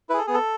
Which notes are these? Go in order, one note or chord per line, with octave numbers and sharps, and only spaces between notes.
E4 G#4 A4 B4
B3 G#4
A4